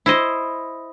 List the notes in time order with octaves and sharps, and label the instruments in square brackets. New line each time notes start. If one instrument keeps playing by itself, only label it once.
[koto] E4 C5 D#5